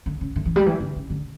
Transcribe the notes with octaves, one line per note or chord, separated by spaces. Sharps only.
D3
C#3
D3
E3
G3
E3
D3
C#3
D3